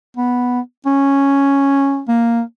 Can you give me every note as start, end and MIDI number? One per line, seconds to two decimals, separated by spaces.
0.17 0.60 59
0.86 2.02 61
2.08 2.42 58